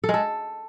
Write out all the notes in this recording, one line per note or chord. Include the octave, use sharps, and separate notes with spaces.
A4
G#3
A4